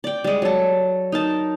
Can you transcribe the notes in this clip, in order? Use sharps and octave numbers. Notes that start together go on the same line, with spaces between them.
D5 G5
G3 G#3
F#3 A4
D#4 A#4 A5